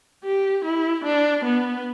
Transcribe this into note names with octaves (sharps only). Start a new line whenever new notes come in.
G4
E4
D4
B3